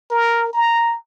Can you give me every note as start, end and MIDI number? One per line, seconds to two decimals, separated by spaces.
0.11 0.51 70
0.53 0.96 82